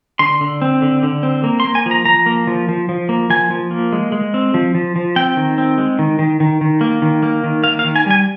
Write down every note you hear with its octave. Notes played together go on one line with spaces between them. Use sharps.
D3 C6
D3
C4
D3
D3
C4
A#3
C6
A#3
G#5
F3
A#5
F3 A#5
A#3
F3
F3
F3
A#3
F3 G#5
F3
A#3
G#3
G#3
C4
F3
F3
F3
C4 G5
D#3
C4
G#3
D#3
D#3
D#3
D#3
A#3
D#3
A#3
D#3
A#3 F5
F5
D#3
G#5
G3 G#5